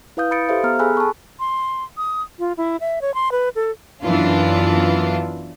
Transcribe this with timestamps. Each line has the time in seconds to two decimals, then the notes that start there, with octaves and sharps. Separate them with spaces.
0.17 E4 B4 F5 D#6 G6
0.31 B5 D#6 A6 C#7 D7
0.49 G4 A4 C5 E5 F5
0.64 B3 A#5 F6
0.79 G#4 A4 G#5 B5 E6 F#6
0.97 A5 B5 C#6
1.40 C6
1.97 D#6
2.39 F4
2.57 E4
2.80 E5
3.02 C#5
3.14 C6
3.32 B4
3.55 A4
4.03 F#2 E3 B3 D4 F4